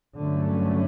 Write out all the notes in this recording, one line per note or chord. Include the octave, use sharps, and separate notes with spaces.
G2 D3 F#3 A3 C#4